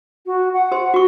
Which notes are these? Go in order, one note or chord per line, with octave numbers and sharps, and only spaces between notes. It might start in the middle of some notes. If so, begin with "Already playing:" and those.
F#4
F#5
G4 C5 C6
F#4 C#6